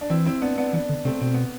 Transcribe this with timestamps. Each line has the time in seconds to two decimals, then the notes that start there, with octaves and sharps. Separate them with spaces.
0.01 D4
0.10 E3 C4 E4
0.25 C4 E4
0.42 B3 D4
0.58 B3 D4
0.73 E3 B3 D4
0.89 D3
1.05 C3 A3 C4
1.21 B2 C4
1.34 B3